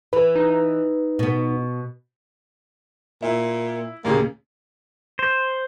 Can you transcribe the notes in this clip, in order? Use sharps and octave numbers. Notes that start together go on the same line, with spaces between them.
E3 B4
D#4
B2 B3
A#2 E4
D#2 A#2 C#3 A#3
C5